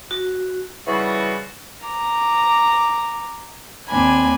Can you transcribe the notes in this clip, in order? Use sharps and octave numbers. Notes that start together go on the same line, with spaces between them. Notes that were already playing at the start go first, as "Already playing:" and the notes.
F#4
C#3 E3 G3 F4 F#4
A#5 D6
D#2 C4 D4 G#5 B5